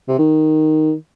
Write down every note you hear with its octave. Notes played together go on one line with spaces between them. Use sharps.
C3
D#3